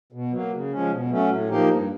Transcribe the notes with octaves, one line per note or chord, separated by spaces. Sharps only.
B2
F#3 A#3
C#3
F3 G#3 C#4
B2
F#3 A3 C#4
A2
F3 A#3 D#4 G4
G2